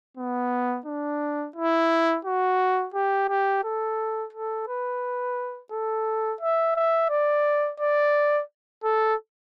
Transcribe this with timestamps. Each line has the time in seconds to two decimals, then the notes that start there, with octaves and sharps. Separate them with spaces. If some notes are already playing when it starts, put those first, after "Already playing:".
0.17 B3
0.86 D4
1.56 E4
2.25 F#4
2.94 G4
3.29 G4
3.64 A4
4.33 A4
4.68 B4
5.72 A4
6.41 E5
6.76 E5
7.10 D5
7.80 D5
8.84 A4